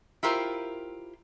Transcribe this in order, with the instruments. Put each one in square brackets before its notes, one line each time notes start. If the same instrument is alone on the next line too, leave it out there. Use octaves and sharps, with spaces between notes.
[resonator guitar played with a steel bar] E4 F4 G4 A#4 C5